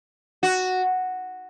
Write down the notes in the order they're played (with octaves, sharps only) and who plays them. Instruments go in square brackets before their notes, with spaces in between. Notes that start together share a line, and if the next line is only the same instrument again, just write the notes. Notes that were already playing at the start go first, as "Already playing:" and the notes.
[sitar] F#4